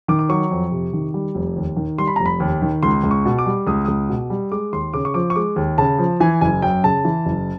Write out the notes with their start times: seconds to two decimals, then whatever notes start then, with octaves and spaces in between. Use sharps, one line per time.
0.08 D#3 D6
0.19 D6
0.29 F#3 C#6
0.51 F2
0.72 C3
0.93 D#3
1.14 G3
1.35 F1
1.56 D#2
1.77 D#3
1.98 G3 C6
2.07 B5
2.16 F1 A#5
2.26 B5
2.40 D#2
2.62 D#3
2.83 C#2 C6
3.03 C#2
3.11 C#6
3.25 B2
3.38 D6
3.46 G3
3.67 C#2 D#6
3.85 C#2 D#6
4.09 B2
4.30 G3
4.52 G#3 D6
4.73 D#2 C6
4.94 C#3 D6
5.05 C#6
5.14 F3 D6
5.30 C#6
5.36 G#3 D6
5.56 D#2
5.78 C#3 A5
5.98 F3
6.20 E3 G#5
6.41 F#1 G#5
6.62 F#2 G5
6.84 C#3 A5
7.05 E3
7.26 F#1